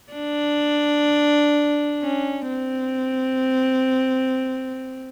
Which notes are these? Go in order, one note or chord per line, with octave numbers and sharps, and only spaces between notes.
D4
C#4
C4